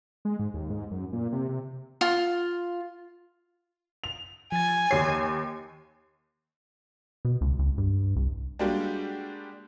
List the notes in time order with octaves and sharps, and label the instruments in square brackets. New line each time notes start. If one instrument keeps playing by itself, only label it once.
[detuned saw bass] G#3
G#2
D#2
G#2
F#2
A#2
C3
C3
[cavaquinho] F4
[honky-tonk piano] F7
[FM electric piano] F3 A6 [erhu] G#5
[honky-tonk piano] D#2 C7 [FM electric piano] C#5
[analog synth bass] B2
C#2
C#2
G2
C2
[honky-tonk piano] G3 G#3 A#3 D4 F#4 G4